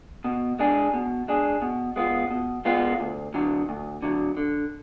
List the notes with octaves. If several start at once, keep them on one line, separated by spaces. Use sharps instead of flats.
B2
G#3 D4 G#4
B2
G#3 D4 G#4
B2
G#3 B3 F4
B2
G#3 B3 F4
D2
D3 F#3
D2
D3 F#3
D3